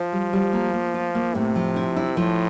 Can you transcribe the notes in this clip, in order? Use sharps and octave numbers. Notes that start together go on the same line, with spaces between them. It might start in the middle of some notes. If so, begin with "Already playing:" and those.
Already playing: F3 C5
G3
G3
A#3
A#3
F4
A#3
A2 C3
F3
E4
E4
A2 F3